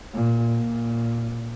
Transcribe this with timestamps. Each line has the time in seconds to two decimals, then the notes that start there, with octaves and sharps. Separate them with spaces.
0.14 A#2
0.59 A#2